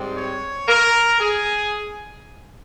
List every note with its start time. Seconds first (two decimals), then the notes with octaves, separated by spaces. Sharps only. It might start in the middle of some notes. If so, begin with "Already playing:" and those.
Already playing: G#2 G3 C4
0.17 C#5
0.68 A#4
1.20 G#4